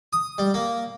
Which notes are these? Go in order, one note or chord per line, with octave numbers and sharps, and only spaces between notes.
D#6
G3
A#3